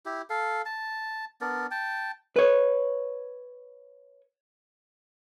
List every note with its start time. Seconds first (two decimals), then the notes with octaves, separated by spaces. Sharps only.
0.06 E4 G4
0.30 A4 F5
0.65 A5
1.41 B3 D4 A#4 D5
1.71 G5 A5
2.36 B4 C#5